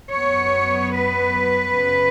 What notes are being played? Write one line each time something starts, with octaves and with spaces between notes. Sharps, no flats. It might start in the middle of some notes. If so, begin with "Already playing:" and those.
F#2 F#3 B3 C#5
B4
F#2 C#3